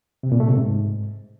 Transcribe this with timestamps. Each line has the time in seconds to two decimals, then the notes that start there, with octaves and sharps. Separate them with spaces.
0.23 C3
0.32 A#2
0.40 A3
0.48 C3
0.57 G#2